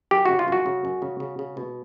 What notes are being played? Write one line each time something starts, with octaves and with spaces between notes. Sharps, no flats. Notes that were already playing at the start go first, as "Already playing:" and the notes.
F#2 G4
C#3 F#4
F4
F#2 F#4
C#3
F#2
C#3
C#3
C#3
B2